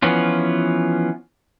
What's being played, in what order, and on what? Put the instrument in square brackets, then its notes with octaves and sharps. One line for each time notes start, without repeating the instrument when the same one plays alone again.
[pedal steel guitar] E3 F3 B3 C#4 F4